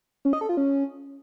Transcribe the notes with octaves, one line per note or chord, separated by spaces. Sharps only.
C#4
D#5
A4
F4
C#4